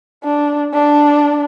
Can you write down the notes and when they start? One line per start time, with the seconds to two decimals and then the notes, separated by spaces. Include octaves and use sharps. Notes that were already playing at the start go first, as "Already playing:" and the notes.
0.24 D4
0.73 D4